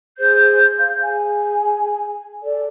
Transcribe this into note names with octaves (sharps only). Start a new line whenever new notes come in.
G#4 C5 G6
F5
G#4 G#5
A4 D5